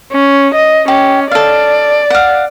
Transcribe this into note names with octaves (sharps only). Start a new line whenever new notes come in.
C#4
D#5
C#4 G4
A4 D5 F5
F5 F#5